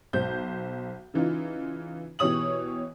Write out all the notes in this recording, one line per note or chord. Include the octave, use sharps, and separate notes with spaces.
B1 C5 G6
C#3 E3 D#4 F4
B2 E3 G4 C#5 D#6 F#7